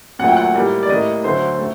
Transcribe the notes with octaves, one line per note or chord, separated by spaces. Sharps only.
A#2 F#3 A3 F#5
G5
F#5
A2 G3 A#3
D5
A2 G3 A#3 D#5
D2 D3 F#3 A3 C5
A3